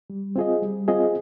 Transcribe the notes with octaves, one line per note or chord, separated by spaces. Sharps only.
G3
C4 F4 G#4 D#5
G3
C4 F4 G#4 D#5